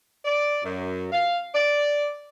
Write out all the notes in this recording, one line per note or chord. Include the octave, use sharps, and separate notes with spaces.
D5
F#2
F5
D5